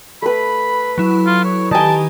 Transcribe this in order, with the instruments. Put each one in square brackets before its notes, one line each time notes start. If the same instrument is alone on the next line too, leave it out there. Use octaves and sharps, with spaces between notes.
[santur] A3 B4 [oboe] B5
[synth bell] F#3 E4
[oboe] F4
C#5
[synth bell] D#3 G4 [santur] D#5 G#5 [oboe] A5